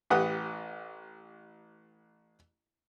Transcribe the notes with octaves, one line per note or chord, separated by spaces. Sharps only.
A1 G4 B4 F#5 D#6